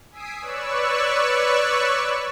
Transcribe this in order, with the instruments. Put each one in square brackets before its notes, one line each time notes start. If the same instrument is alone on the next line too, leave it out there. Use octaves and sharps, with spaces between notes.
[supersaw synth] G#5 D#6 E6 B6 C7 D7
B4 C#5 D5 C#6 E6 F#6